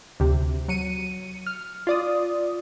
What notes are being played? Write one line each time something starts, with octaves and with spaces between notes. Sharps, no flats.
D2 C3
F#3 C#7 D#7
F6
F4 D5 D#6